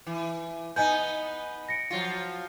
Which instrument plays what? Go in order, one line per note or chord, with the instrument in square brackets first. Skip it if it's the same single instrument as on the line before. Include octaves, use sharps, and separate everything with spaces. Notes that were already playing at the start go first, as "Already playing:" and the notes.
[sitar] E3
[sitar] B3 D#4 [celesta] D#5 G#5 G6
[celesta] A#6 C#7 D7
[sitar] F3 F#3 F4